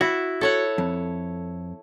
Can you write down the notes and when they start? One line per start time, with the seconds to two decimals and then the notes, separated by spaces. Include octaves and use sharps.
0.01 E4 F#4
0.41 A4 C#5 F#5
0.78 F2